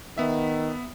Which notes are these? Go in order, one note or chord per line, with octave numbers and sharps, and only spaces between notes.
D#3 B3 E5